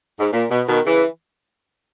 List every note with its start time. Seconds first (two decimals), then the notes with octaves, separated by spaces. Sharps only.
0.19 G#2
0.33 A#2
0.51 B2
0.68 B2 D#3
0.85 C#3 E3